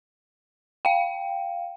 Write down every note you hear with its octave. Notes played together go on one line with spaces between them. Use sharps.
F5 G5